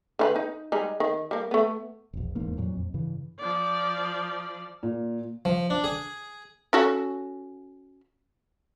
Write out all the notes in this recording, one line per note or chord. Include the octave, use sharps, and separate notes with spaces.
D3 F4 B4
D#4
G3 G#3 D#4
D#3
G3 A#3
A3 B3
E1 A#1
D#1 E2 G#2 A#3
F2 A#2 F#3
F2
G2 C#3 E3
F3 D5
A#2
F3
D4
G#4
C#4 F#4 A4